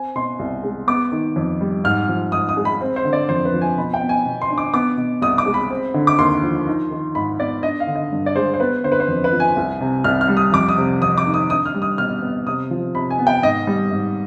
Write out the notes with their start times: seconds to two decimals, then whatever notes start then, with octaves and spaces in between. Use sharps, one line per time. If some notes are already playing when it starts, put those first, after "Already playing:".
Already playing: C4 G#5
0.15 B2 C6
0.39 C2
0.64 G#3
0.87 B3 D6
1.12 D#3
1.36 F2
1.61 G3
1.84 G#2 F6
2.08 F3
2.32 G#2 D#6
2.49 D#6
2.57 G#3
2.65 B5
2.81 C4
2.96 C5
3.05 D3
3.13 D5
3.29 F2 C5
3.45 B4
3.53 F3
3.61 G#5
3.77 B2 B5
3.94 G5
4.02 B3
4.09 G#5
4.26 B2
4.42 C6
4.50 D4
4.58 D6
4.74 B3 D6
4.97 B2
5.22 C2 D#6
5.38 D6
5.46 G#3
5.54 B5
5.70 C4
5.94 D3
6.07 D6
6.18 D#2 C6
6.43 F3
6.67 D#4
6.91 D#3
7.15 G#2 B5
7.40 B3 D5
7.63 D4 D#5
7.80 F5
7.87 D3
7.96 D#5
8.12 G2
8.26 D5
8.36 G#3 C5
8.54 C5
8.60 B3 B4
8.84 D3 C5
8.92 B4
9.00 C5
9.08 F2
9.24 B4
9.32 F3
9.40 G#5
9.56 C2
9.81 C3
10.04 C2 F6
10.21 F6
10.28 G3
10.37 D#6
10.53 F2 D6
10.69 D#6
10.77 C3
11.01 F2 D#6
11.18 D6
11.26 D#3
11.34 D#6
11.50 D4 D#6
11.66 F6
11.74 G3
11.82 D#6
11.98 B2 F6
12.22 B3
12.47 C3 D#6
12.71 F3
12.95 C3 B5
13.10 G#5
13.19 B3
13.27 G5
13.42 G#2 D#5
13.67 G3
13.91 G#2